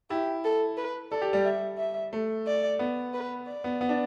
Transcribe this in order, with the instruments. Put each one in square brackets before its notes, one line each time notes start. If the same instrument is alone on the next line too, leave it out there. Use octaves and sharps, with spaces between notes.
[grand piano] E4 [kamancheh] G4
[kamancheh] A4
B4
[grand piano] A4 [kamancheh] D5
[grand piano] G4
G3
[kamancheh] E5
E5
[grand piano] A3
[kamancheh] D5
[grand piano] B3
[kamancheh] B4
D5
[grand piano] B3
B3
D4